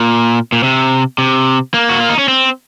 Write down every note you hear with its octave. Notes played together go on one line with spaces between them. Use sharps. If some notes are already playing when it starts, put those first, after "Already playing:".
Already playing: A#2
A#2
C3
C3
A#3
F#4
F4
D#4
C#4
C4